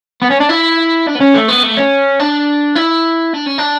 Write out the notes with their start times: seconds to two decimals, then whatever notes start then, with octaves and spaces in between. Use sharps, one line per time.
0.22 B3
0.30 C#4
0.40 D4
0.49 E4
1.07 D4
1.15 B3
1.21 C#4
1.34 A3
1.49 B3
1.64 A3
1.77 C#4
2.20 D4
2.76 E4
3.34 D4
3.46 C#4
3.58 D4